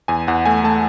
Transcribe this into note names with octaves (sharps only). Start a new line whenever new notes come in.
E2 G#5
E2 F#5
A3 G#5
A3 A5